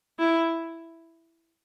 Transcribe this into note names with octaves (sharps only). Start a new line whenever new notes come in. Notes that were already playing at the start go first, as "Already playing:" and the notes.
E4